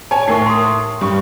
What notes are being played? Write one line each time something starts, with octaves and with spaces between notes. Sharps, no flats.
C#5 G#5 A5
A2 D#4 A#4 C#6 C7
C6 D#6
G2 C#6